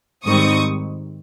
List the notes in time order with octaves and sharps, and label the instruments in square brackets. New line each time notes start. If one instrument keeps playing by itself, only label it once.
[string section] G#2 D#3 G3 C4 D#4 C#6 D#6